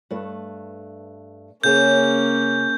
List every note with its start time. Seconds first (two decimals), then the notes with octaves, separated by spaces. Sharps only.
0.11 G2 A3 B4
1.64 C#3 A#3 C#4 G#4 C#5 G6